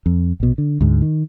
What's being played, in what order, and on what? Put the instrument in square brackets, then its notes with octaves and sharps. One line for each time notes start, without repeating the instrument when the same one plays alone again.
[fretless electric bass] F2
A#1 B2
D3
D2 G#2
D#3